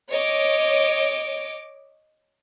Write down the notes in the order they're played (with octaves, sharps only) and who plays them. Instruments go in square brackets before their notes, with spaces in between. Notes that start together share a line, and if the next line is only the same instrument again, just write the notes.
[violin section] C#5 D#5 D6